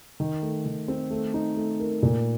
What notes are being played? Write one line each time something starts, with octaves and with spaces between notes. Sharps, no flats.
D#3
A3
D#3
C4
A3
D#4
A3
A#4
A#2